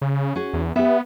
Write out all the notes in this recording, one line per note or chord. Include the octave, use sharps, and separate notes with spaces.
C#3
C#4 F#4 G#4
E2
B3 G4 E5